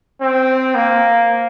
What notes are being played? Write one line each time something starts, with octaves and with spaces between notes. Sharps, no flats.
C4
A#3